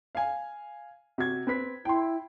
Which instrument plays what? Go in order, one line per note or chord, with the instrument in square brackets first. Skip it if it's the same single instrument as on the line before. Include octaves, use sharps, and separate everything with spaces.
[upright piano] F5 G#5
C3 F#4 G#6
C4 B4 B6
[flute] E4 [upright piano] G5 C6